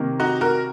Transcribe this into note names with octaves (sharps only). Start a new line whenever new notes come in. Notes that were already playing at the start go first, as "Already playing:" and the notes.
Already playing: C3 D#3 A#3
D#4 F#4
F#4 A#4